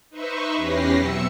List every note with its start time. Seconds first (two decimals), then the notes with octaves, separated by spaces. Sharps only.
0.10 D#4 B4 C5 E5 C#6
0.56 E2 C#4 G4 B4 A#6 C7
0.97 B2 F#3 C4 E5 E6 C#7